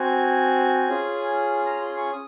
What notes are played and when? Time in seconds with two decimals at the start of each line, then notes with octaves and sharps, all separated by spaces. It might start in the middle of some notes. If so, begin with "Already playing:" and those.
Already playing: C4 F#4 G#5
0.89 C#4 F4 G#4
1.66 A#5
1.82 C6
1.97 C#6
2.12 D#6